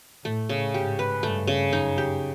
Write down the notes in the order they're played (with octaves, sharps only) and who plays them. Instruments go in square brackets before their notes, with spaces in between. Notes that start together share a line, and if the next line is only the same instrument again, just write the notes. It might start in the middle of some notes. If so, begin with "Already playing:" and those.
[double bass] A2 [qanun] A3
[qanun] C#3
[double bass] G#2 [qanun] G4
[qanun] B4
[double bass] G2 [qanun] A3
[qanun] C#3
[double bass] F#2 [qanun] D#4
[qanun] G4